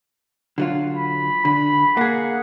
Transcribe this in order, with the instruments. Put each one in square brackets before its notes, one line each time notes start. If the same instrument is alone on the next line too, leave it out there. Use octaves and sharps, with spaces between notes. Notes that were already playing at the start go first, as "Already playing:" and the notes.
[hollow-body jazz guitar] D3 F#3 F4
[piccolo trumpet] B5
[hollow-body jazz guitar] D3 [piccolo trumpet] B5
[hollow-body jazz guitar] A#3 G#4 [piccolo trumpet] F#5